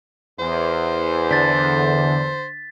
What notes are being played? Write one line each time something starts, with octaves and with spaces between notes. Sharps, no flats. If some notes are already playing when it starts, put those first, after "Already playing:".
E2 C5
D3 A6 B6